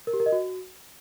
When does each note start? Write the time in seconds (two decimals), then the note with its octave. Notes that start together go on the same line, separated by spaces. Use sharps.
0.07 A#4
0.13 G4
0.20 A#4
0.26 D#5
0.32 F#4